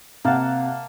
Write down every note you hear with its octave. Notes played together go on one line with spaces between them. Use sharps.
C3 A#3 F5 F#5 A5